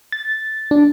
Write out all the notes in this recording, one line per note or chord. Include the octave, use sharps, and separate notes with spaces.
A6
D4